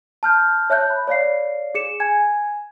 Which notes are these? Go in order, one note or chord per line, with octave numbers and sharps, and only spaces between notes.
A5 F6 G6
C#5 E5 A5 F#6 G6
B5
C#5 D5 F5 C7
G#4 C#7 E7
G#5 G#6